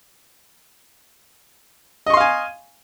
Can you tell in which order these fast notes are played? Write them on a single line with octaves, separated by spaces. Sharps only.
D#5 C#6 C6 F5 G#5